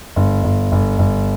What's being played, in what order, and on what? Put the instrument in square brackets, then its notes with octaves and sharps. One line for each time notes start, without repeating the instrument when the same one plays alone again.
[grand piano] G1
G1
G1
G1